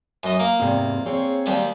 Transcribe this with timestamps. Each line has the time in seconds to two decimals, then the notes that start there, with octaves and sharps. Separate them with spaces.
0.23 F#2 D#5
0.40 A#3
0.59 E2 G#2 C3
1.06 C4 G#4 C#5
1.46 D#2 G3